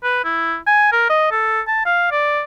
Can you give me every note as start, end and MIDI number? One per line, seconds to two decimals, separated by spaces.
0.04 0.20 71
0.24 0.56 64
0.67 0.89 80
0.92 1.05 70
1.10 1.28 75
1.32 1.61 69
1.67 1.85 81
1.86 2.11 77
2.12 2.42 74